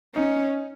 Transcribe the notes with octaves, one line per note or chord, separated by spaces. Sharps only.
C#4 D#4